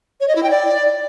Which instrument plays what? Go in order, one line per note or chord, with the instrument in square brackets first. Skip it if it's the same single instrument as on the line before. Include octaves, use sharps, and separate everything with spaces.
[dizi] C#5
D#5
E4
G5
D5